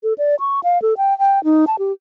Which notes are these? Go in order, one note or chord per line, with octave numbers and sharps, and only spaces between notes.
A4
D5
C#6
F5
A4
G5
G5
D#4
A5
G4